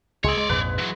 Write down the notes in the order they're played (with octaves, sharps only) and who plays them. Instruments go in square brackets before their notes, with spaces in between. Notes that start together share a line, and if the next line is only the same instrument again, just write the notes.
[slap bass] C#2 [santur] G#3 G#4 E6 [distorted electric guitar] C#5 D5
[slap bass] G#3 [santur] C6
[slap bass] A#1 F2 G#2 [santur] B4
[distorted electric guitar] E3 F#3